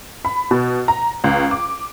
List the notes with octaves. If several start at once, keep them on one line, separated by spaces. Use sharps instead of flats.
B5
B2
A#5
C#2
D6